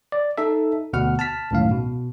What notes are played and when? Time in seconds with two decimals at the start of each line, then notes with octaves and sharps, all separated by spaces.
0.12 D5
0.38 D#4 A4 E5
0.93 D2 B2 F#5 F6
1.19 A5 F6 B6
1.51 C#2 F#2 A2 D#3 F5
1.71 B2